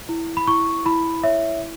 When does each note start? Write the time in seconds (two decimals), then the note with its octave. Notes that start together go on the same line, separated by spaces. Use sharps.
0.09 E4
0.37 B5
0.47 E4 C#6
0.85 E4 B5
1.24 C#5 E5